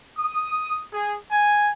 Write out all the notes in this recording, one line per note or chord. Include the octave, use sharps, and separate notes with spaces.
D#6
G#4
G#5